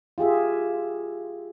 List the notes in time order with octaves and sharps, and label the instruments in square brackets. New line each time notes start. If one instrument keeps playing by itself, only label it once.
[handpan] F4 G4 G#4 E5